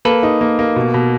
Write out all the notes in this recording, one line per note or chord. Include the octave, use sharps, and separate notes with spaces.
A#3 A4 B4
D#4
A#3
A#3
B2
B2